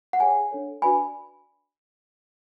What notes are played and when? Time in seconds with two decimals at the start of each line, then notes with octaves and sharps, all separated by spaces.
0.13 F#5
0.20 G#4 C#5 G#5
0.51 D4 A4 C#5
0.82 D4 F#4 B4 D5 G#5 B5